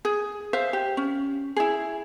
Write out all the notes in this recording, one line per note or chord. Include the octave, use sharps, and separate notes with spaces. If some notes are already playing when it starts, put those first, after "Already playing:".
G#4
C5 E5 F5
G4
C#4
E4 G#4